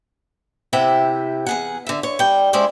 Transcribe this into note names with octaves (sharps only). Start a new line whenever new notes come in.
C3 E4 G4 E5 F#5
E2 G#4 F#5
D3 E5
C#5
G3 G5
G#3 C#4 E4 C5 D5 E5